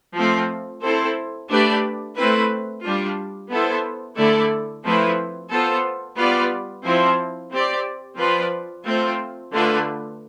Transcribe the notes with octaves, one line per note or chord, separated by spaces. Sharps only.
F3 A3 C4
C4 E4 A4 C5
A3 D4 G4 B4 D5
A3 C4 E4 B4
G3 D4 F4
B3 E4 A4 C5
D3 A3 E4 A4 D5
F3 A3 C4 E4 B4
B3 F4 A4 C5
G3 B3 F4 B4 D5
F3 C4 E4
C4 G4 D5
F3 C4 F4 B4 D5
A3 C4 F4
D3 A3 D4 F4 B4